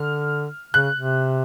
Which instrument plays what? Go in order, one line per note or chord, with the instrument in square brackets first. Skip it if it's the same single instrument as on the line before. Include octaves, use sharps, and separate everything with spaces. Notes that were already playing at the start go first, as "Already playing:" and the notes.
Already playing: [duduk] D3 [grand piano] F6
[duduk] C#3 [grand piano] F#6
[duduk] C3